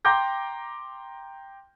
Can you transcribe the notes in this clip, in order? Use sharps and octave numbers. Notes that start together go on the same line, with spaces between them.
G5 A#5 C6 D6 G6 A#6